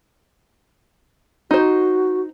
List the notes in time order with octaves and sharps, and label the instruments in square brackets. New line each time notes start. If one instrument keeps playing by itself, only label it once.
[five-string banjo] D#4 C5 [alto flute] F#4